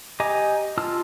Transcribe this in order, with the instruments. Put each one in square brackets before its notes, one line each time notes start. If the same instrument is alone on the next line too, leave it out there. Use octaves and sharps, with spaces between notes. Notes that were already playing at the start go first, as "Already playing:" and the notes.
[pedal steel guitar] G4 D#5 G#5 A#5 D6
F4 A5 E6 F6